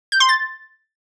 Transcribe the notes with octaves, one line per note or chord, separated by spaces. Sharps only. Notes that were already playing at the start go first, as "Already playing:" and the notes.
G6
C6
A6